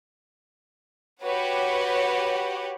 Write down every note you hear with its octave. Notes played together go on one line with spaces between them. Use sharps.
F#4 G4 B4 C#5 F#5